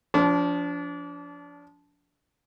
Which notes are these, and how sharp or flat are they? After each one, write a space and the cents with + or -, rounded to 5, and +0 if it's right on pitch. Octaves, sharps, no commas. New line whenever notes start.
F3 +0 D4 -30